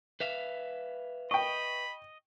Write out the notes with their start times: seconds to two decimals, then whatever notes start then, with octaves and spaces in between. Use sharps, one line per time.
0.20 B4 E5 F5
1.31 D#5 G5 B5 C#6